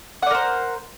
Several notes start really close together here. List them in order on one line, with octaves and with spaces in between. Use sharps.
F#5 D5 A#4 C5